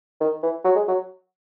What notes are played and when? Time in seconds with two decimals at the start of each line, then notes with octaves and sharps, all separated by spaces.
0.21 D#3
0.43 E3
0.65 F#3
0.76 G#3
0.88 F#3